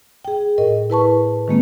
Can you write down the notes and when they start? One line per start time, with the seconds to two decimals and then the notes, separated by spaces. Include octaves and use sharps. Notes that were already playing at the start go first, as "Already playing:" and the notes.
0.25 G#4 G5
0.58 A2 A#4 D#5
0.90 E4 B4 A5 C#6
1.48 D#3 G#3 A#3 C4